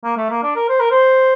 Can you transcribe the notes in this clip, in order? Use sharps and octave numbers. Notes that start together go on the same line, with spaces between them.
A#3
A3
A#3
D4
A#4
C5
A#4
C5